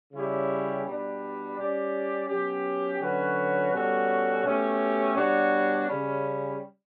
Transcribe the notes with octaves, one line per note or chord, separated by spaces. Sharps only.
C#3 G3 C#4 E4 G4
B2 G3 D4
G3 C#4 G4 D5
B2 F#3 C#4 G4
D3 F#3 C#4 F#4 B4
B2 G3 C#4 F#4 A4
B2 A3 C#4 G4
B2 G3 D4 F#4 C#5
C#3 G3 C#4